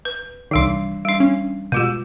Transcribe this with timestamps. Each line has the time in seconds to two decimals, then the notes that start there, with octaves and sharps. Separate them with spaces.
0.05 B4
0.51 C2 D#3 E3 G3 D4
1.05 G3 D4
1.20 C#4
1.72 B2 G#3 F4 G4